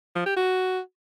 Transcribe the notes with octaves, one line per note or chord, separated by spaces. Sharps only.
F3
G4
F#4